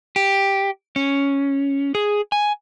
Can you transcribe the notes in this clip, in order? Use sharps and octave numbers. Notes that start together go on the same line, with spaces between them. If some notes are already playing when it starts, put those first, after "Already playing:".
G4
C#4
G#4
G#5